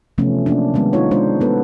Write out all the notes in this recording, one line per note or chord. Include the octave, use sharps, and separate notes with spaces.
C3 E3 F3 A3 B3 C#4
F#3 A#3 C#4 D4
D#3 G3 G#3 B3
D#4 F4 C#5
G#3 B3 D4 C5
G#3 B3 A4 B4